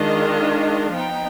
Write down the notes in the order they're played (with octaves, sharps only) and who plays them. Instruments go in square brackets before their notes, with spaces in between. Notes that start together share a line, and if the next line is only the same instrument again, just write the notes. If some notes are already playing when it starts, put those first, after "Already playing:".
Already playing: [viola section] D#3 G#3 D4 F4 D#5
F3 B3 D#4 G5